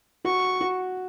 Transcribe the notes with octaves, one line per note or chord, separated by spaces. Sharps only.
F#4 C#6
F#4